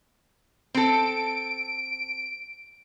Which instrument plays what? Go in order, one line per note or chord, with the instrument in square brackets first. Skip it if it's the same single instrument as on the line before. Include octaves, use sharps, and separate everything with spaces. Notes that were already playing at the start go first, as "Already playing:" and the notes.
[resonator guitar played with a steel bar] C4 A4 [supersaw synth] D7